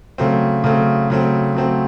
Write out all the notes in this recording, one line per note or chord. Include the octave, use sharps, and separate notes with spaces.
C#3 F#3 A3 C4
C#3 F#3 A3 C4
C#3 F#3 A3 C4
C#3 F#3 A3 C4